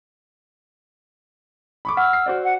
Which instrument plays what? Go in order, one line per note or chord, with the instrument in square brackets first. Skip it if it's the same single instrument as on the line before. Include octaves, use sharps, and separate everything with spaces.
[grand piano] B5 C#6 D6
[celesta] F#5 [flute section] E6 F6
[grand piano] C7
F#4 C5 D5
[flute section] F#5